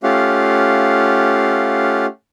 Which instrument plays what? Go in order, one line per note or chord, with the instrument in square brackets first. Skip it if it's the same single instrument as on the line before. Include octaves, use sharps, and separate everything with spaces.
[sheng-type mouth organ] A3 C#4 F4 G4 F5 F#5